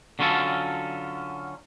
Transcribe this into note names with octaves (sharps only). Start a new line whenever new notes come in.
D3 F#3 C#4 F4 A4